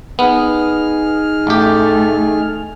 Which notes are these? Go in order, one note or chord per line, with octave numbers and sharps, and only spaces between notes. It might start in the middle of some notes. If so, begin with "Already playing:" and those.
B3 D#4 G#4 F6
A1 A3 G4